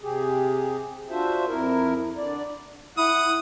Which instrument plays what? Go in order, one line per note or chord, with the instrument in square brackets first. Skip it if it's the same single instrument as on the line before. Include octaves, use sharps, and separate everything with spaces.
[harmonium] C3 G4 G#4
D4 F4 F#4 C5 E5
F2 E4 A#4
D3 D5
[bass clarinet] E4 [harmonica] F#5 D#6